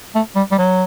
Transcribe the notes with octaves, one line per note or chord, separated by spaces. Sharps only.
A3
G3
G3
F#3